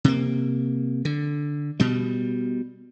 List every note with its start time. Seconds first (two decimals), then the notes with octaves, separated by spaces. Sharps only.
0.04 C3 A#3
1.05 D3
1.80 B2 G3